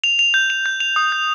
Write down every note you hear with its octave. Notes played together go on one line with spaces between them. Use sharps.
F7
F7
G6
F7
G6
F7
D#6
G6